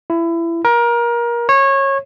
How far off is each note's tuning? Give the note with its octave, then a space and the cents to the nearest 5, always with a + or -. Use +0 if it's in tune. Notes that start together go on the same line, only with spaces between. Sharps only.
E4 +25
A#4 +25
C#5 -20